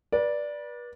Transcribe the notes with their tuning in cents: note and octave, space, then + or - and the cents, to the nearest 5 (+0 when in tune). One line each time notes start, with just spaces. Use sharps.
B4 -35 D5 +0